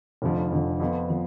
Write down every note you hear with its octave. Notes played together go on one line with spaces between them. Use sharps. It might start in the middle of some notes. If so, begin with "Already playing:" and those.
F1 F2 D3 F3
F1 F2 D3 F3
F2 F3 B3 F4
F3 B3